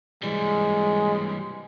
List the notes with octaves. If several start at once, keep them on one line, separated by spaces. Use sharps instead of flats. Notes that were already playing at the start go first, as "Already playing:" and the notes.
E3 G3 G#3